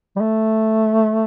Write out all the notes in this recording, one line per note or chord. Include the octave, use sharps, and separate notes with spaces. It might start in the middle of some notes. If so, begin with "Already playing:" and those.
G3
A3